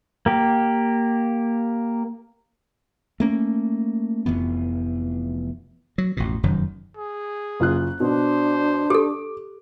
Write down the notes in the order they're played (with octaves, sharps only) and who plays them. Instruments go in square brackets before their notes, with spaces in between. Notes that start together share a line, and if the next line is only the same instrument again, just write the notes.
[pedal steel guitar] A#3 G4
[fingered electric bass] A3 A#3 C#4
F1 F2 E3 B3
[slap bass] F#3
A1 F2 B2
F1 F#2 D#3 F#3
[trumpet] G#4
[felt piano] F#1 F4 F#6
[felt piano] B2 [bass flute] D4 [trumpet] C5
[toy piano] G4 A4 [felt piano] D6